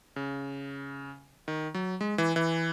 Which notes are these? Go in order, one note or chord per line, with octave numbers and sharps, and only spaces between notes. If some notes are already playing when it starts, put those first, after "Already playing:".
C#3
D#3
F#3
G#3
E3
E3